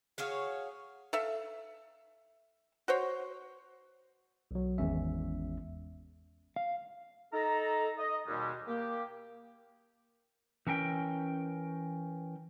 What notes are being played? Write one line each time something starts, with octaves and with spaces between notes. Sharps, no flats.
F#4 G#4 C#5 F5
A4 E5 F5
F#4 C5 C#5
B1 F#3
G#1 E2 G#3 C#4 E5
F5
D#4 A4 A#5
D#5
D#2 B2 G3 G#3
A#3 G4
E3 C#4 A#4 G5